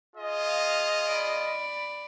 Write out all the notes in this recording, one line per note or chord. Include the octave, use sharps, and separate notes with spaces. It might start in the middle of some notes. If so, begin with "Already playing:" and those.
F4 G#4 D#5
F5
D5 B5